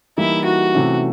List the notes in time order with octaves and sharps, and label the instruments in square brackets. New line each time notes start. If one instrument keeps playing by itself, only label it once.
[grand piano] E3 G3 A#3 D#4 [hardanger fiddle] E4
[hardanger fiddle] F#4
[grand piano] C3 E3 A3 C#4